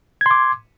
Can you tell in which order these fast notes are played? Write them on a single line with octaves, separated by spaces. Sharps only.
G#6 C6 D6